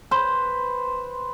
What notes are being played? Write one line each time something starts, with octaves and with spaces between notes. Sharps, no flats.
B4 C5